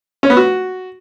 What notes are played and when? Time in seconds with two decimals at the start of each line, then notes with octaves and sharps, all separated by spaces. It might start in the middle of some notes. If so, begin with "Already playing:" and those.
0.23 C#4
0.30 B3
0.37 F#4